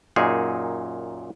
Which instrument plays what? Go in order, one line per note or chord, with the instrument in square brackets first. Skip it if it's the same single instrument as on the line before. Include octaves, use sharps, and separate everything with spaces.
[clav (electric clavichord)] F#2 A#2 D#4 G#4